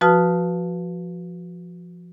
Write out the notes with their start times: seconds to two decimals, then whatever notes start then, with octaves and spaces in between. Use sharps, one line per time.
0.01 F3 F#4 B4 A5 D#6 F6